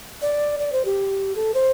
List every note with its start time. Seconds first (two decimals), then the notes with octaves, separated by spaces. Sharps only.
0.22 D5
0.60 D5
0.72 C5
0.85 G4
1.36 A4
1.54 C5